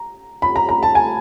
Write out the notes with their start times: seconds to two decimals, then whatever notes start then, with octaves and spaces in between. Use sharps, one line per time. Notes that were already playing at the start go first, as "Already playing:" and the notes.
Already playing: A#5
0.42 B5
0.56 A#5
0.69 A#5
0.83 A5
0.95 G#5